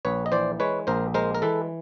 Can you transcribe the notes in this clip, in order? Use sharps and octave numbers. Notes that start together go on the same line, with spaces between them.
A#1 B4 C#5
D#5
E3 C5 D5
G#3 B4 C#5
A#1 A#4 C5
G#3 A#4 C5
A#4
E3 A4 B4